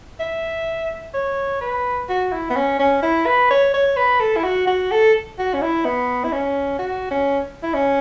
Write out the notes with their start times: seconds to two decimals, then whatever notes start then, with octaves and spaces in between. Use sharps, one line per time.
0.20 E5
1.14 C#5
1.61 B4
2.09 F#4
2.32 E4
2.50 B3
2.56 C#4
2.79 C#4
3.03 E4
3.26 B4
3.50 C#5
3.74 C#5
3.97 B4
4.20 A4
4.36 E4
4.44 F#4
4.67 F#4
4.91 A4
5.39 F#4
5.54 C#4
5.62 E4
5.85 B3
6.24 E4
6.32 C#4
6.79 F#4
7.11 C#4
7.63 E4
7.74 C#4